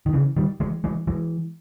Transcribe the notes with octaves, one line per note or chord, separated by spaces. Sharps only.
D#3
C#3 E3
D#3 G3
E3 G#3
E3 G#3
E3 G#3